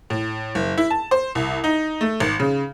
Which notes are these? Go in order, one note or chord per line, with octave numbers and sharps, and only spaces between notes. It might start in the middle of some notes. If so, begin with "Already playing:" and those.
A2
F#1
E4
A5
C5
C2
D#4
A3
G#1
C#3